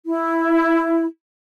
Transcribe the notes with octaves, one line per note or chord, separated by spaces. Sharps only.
E4